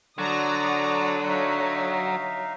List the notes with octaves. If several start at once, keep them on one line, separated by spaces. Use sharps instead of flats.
D3 F#3 F#4 D5 A#5 D#6
D#4 C#5 E5 F5